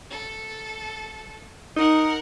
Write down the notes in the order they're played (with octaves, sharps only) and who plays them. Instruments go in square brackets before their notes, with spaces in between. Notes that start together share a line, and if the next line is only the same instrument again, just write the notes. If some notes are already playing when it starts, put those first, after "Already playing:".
[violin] A4
[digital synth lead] D#4 [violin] A#4 F#5